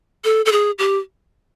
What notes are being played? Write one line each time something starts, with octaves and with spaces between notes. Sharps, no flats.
A4
A4
G#4
G4